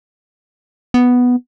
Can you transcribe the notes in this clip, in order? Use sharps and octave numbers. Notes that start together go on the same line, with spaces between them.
B3